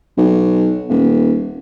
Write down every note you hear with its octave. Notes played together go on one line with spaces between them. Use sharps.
B1
D#1